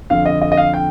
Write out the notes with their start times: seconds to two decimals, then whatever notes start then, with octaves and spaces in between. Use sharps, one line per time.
0.10 F2 D3 F5
0.26 D#5
0.42 D#5
0.52 D#5
0.57 F5
0.74 G5